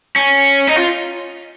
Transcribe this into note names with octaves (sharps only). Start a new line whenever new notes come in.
C#4
D#4
F4